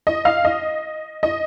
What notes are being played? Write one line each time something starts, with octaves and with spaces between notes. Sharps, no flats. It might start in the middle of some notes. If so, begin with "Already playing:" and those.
D#5
F5
D#5
D#5